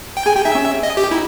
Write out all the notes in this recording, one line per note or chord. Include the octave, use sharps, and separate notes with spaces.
G5
G#4 G#5
G4 G5
D#4 E5
C#4
D#5
G4
D#4 E4